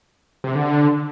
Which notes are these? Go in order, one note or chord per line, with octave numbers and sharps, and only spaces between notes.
C3
D3